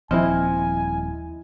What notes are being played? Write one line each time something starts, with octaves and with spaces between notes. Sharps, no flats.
D#1 F3 C4 E4 D#5 G#5